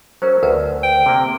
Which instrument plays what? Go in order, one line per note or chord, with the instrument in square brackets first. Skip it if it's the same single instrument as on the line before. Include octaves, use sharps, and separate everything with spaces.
[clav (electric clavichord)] F#3 C#4 [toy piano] A#4 C5
[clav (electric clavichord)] D2 [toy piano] A#4 B4 A5
[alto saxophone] G5
[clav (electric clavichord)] C3 A#3